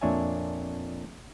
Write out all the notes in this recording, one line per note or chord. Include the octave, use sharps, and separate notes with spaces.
F2 A#2 D4 C#5 E5 G#5